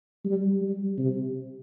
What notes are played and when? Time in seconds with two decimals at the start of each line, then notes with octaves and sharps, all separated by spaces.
0.25 G3
0.62 G3
0.98 C3